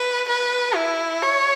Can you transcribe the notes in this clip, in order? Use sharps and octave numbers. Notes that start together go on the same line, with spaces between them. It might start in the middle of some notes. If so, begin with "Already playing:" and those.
Already playing: B4
B4
E4
C#5